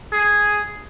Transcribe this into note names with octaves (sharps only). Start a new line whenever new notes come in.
G#4